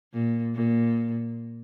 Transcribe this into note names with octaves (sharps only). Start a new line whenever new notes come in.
A#2
A#2